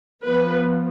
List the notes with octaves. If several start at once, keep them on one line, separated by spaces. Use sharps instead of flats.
F3 B3 B4